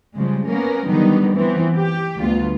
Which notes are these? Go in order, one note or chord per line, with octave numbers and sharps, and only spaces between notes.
C#3 F3 G3 G#3
A#3 B3 C#4 A#4
D3 D#3 F#3 G3 B3 D#4
E3 F3 B3 C4
G4
D2 G3 B3 F4